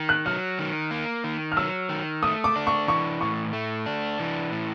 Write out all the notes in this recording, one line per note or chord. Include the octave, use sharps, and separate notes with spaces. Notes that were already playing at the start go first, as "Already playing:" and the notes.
Already playing: D#3
F#6
F#3 F6
D#3
A#3
D#3
F6
F#3 E6
D#3
A3 D#6
D6
D4
C#6
E3 C#6
A2 C#6
A3
D4
E3
A2